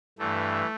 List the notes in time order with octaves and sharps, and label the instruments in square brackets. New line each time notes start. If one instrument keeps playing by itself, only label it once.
[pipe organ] G2 E3 A3